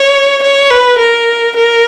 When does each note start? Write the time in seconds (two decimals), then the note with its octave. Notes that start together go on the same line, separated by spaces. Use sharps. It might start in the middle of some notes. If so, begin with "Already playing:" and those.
Already playing: C#5
0.43 C#5
0.70 B4
0.98 A#4
1.56 A#4